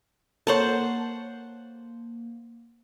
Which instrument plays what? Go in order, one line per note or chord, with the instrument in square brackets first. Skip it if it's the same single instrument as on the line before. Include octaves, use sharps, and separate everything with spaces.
[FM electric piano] A#3 [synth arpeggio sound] A4 A#4 C#5 [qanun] C5 F#5 A5